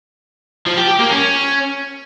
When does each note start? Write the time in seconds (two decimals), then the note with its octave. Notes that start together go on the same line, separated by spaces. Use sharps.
0.66 F3
0.77 G4
0.88 G4
0.99 A#3
1.10 C#4